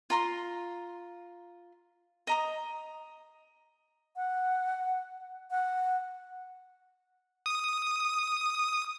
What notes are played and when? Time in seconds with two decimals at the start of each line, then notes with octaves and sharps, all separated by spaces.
0.10 F4 A#5 C6
2.27 D#5 A#5 D#6
4.16 F#5
5.51 F#5
7.46 D#6